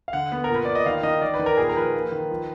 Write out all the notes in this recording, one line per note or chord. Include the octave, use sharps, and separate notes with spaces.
F5
D3 F#5
B3
A#4
A#2
B4
A#2 D5
D#5
D#3 F5
D#3 D#5
D#3 D5
B4
D#3
A#4
A#2 G#4
A#4
F3 B4
A#3
D#3
F3